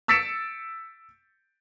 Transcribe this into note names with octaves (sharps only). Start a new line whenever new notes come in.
E6 A6 B6 C#7 D7 E7